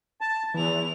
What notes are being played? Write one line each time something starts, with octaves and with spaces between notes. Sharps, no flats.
A5
E2 E3 E4 F7